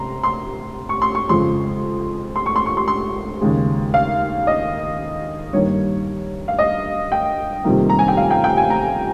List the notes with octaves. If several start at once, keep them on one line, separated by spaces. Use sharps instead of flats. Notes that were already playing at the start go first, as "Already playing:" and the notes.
Already playing: C3 A#5 C6
C6
C#6
C6
C#6
F2 C#3 F3 G#3 C6
C6
C#6
C6
C#6
C6
C6
D#2 C#3 G#3
F5
D#5
G2 D#3 G3 A#3 C#5
F5
D#5
G5
F2 C3 D#3 G3 A#3
A#5
G#5
G5
F5
G5
G5
G#5
A#5